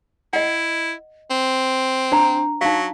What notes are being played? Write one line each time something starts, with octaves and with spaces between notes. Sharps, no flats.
E4 D#5 F#5
C4
D4 C5 A#5
F#3 D#4 F5